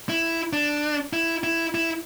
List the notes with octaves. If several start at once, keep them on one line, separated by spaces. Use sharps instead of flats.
E4
D4
E4
E4
E4